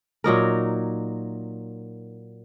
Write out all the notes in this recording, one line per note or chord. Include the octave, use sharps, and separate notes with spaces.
A#2 F#3 D#4 A#4